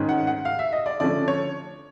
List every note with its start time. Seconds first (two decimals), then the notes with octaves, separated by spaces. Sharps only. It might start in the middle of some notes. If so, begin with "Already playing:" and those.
Already playing: G#2 D#3 G#3 C#4
0.09 F#5
0.27 F#5
0.45 F5
0.59 E5
0.72 D#5
0.86 D5
1.00 D3 F3 A3 C#4 D5
1.28 C#5